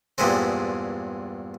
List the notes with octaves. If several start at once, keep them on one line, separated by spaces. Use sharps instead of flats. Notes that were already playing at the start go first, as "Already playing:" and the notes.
E2 G2 A#2 G3 G#3 C4